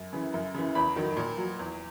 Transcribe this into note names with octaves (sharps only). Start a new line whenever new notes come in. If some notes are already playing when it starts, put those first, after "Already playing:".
Already playing: F#2
C#3 E3
F#2
C#3 E3
E2 B5
D#3 F#3
A#2
F#3
E2